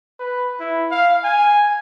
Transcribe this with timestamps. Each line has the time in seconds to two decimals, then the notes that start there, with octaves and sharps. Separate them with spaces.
0.20 B4
0.60 E4
0.91 F5
1.24 G#5